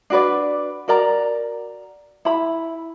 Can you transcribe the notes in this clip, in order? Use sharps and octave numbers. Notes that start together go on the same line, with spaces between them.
D4 F#4 B4 D5
F#4 A#4 D5 A#5
E4 B5